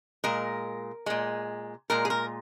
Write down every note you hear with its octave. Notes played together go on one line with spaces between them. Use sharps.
A#2 G#3 A#4
A#2 G#3
A#2 G#3 A#4
G#4
A#4